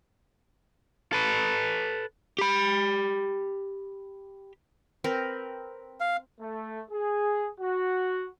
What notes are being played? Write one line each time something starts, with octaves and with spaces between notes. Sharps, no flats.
A4 B4
G4 B5
C4 A#4 B4
F5
A3
G#4
F#4